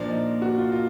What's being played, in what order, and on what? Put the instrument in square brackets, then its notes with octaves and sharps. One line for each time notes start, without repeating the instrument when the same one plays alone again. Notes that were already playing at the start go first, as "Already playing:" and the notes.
Already playing: [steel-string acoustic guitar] A#2 F3 A#3 [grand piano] D4
[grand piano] D#4
F#4
F4
F4